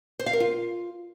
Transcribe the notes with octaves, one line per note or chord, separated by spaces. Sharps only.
C5
F5
A#4
F4